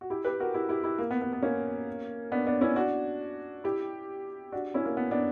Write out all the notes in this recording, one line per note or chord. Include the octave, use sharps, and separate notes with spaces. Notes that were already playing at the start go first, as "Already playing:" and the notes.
F#4
E4 G4
G4 B4
F#4 A#4
E4 G4
E4 G4
E4 G4
A#3
B3
B3
B3
A#3 C#4
B3 D4
B3 D4
C#4 E4
D4 F#4
E4 G4
D4 F#4
C#4 E4
A#3
B3
B3 D4